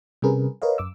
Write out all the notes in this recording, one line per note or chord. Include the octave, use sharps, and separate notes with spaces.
C3 G3 C#4 G#4 A#4 B4
A#4 B4 C#5 D#5 F5
F#2 D6 E6